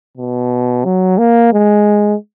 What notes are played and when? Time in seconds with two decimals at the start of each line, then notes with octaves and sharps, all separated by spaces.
0.17 B2
0.85 F#3
1.18 A#3
1.52 G#3